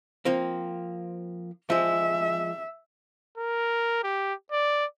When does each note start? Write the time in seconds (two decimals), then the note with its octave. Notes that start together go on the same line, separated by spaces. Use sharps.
0.25 F3 A#3 C4
1.70 F3 G#3 E5
3.37 A#4
4.03 G4
4.52 D5